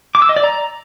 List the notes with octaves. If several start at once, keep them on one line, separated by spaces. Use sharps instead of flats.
D6
E6
D#5
D5
A#5